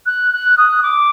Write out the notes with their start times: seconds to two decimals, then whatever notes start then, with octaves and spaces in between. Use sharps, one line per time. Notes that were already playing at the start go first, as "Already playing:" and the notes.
0.06 F#6
0.32 F#6
0.58 D#6
0.83 D6